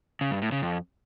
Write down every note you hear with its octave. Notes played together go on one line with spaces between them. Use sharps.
C#3
G2
A2
C#3
F2